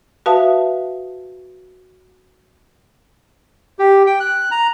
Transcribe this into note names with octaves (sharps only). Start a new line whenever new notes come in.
F#4 B4 E5 F5 A5 D#6
G4
G5
F#6
A#5